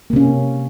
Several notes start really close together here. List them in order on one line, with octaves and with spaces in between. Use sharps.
A#3 C3 C#4